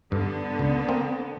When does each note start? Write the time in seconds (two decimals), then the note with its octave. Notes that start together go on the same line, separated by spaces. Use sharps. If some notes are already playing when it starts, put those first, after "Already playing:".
0.12 G2 D3 B3
0.59 C#2
0.89 A#3 C4